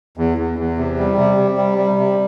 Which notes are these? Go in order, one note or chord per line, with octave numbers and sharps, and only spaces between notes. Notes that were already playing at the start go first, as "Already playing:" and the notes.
E2
E2
E2
C3
G3
C3
C3
G3
G3
C3